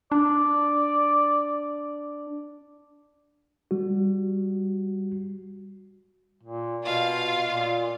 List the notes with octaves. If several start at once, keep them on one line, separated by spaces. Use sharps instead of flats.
D4 D5
G3 F#4
A#2
B2 F4 F5
A#2